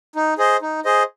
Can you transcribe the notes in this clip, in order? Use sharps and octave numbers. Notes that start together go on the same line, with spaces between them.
D#4
G#4 C5 D#5
D#4
G#4 C5 D#5